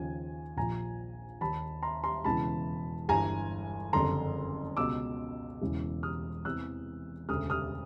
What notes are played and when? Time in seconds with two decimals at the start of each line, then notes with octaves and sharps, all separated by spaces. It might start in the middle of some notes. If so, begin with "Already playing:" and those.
Already playing: D#2 C#3 F3 G#5
0.57 A#1 A#2 F3 G#5 A#5
1.41 D#2 D#3 A5 B5
1.83 A#5 C6
2.04 A#5 C6
2.25 E1 E2 C#3 E3 A5 B5
3.09 G1 G2 E3 G#5 A#5
3.93 F#1 F2 D3 A#5 C6
4.77 C#2 B2 D6 E6
5.61 E1 E2 C#3 E3
6.03 D#6 F6
6.45 E2 C3 E3 E6 F#6
7.29 E1 D2 C#3 D#6 F6
7.50 D#6 F6